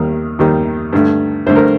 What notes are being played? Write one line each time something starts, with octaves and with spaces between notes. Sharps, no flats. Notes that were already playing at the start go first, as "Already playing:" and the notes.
Already playing: D#2 D#3 G3
D#2 D#3 G3
G2 D3 A3
G2 D3 A3 C5
A#4